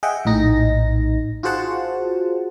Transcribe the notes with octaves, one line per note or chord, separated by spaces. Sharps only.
G#4 D#5 E5 F#5 G5
A#1 A2 D#4 A#6
F4 F#4 G#4 C5 F#5 A5